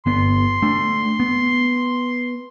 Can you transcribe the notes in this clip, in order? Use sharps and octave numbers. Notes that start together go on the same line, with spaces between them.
G1 B3 C6
A3 D4
B3